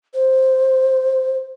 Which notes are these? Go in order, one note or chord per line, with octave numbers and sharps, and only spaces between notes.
C5